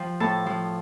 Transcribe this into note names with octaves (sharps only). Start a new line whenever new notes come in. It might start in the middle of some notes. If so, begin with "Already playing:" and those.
Already playing: F3 G5
A2 A5
F3